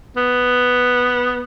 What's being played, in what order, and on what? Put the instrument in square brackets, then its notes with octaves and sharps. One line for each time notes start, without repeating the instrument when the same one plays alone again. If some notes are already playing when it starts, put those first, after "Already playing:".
[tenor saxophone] B3